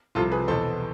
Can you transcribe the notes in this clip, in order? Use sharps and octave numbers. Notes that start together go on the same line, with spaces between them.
C2 C3 F3 F4 A4
G#4 B4
E2 B2 A4 C5